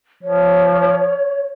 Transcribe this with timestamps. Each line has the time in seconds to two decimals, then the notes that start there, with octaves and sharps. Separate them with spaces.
0.23 F3 C#5